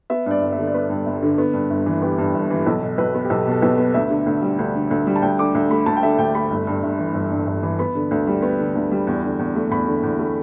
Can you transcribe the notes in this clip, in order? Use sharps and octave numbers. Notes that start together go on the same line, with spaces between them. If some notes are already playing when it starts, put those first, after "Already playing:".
B3 E5
G2 D5
G1
E5
D3
D5
B3 B4
G2
G1
D3
B3
G2
G1
E3
B3 G4
G2
G1
E3
B1 A4
B2
B1 B4
B3
G4
B1 A4
B2 A4
B1 B4
B3
D2 E5
D3
D2
G3
D2
D3
D2
G3
A5
D2 G5
D3 D6
D2
A3 B5
D2 A5
G5
D3 E5
D2 G5
A3 B5
G1
G2
G1
E3
G1
G2
G1
E3
B3 B5
D3
D2
G3
B3
D3
D2
G3
E2
D3
E2
A3
E2 B5
D3
E2
A3